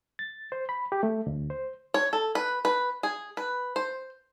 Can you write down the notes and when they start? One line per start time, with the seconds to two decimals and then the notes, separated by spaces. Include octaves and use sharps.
0.19 A6
0.52 C5
0.69 B5
0.92 G4
1.03 A3
1.27 D2
1.50 C5
1.94 C#5
2.13 A4
2.35 B4
2.65 B4
3.03 G#4
3.37 B4
3.76 C5